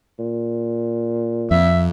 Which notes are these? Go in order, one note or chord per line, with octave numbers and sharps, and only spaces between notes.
A#2
F2 E5